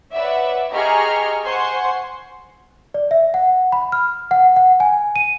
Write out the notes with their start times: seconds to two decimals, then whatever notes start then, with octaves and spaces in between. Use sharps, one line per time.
0.13 B4 C#5 D5 E5 F#5
0.73 G4 G#4 D#5 A#5 C#6 F6
1.45 C5 F#5 G#5 C6 C#6
2.94 D5
3.11 E5
3.34 F#5
3.72 B5
3.92 F6
4.31 F#5
4.56 F#5
4.80 G#5
5.16 D#7